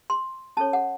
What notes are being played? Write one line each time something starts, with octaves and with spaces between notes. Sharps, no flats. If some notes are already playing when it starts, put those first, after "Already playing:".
C6
C#4 A4 C#5 A5
F#5